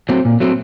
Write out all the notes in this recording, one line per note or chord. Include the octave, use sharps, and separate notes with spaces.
F#3 A3 C4
A#2
F#3 A3 C4